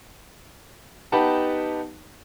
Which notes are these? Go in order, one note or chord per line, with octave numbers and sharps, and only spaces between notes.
B3 D#4 G4 B4 F#5 A5